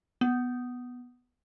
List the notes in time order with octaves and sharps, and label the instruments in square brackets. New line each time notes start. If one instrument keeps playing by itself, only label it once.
[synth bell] B3